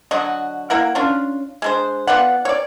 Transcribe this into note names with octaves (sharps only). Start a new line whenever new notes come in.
D3 F#3 F#4 D#5
A#3 E4 A#4 F#5
C#4 D4 F4
G#3 D4 C5
B3 F4 D5 F#5
C#5 D5